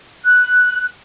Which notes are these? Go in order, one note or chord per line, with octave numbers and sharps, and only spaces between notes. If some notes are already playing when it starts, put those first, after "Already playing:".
F#6